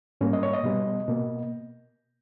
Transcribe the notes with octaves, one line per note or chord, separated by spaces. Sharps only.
G#2 G3 A#3 C#4
D#5
C#5
D#5
B2 G3 B3
B2 A#3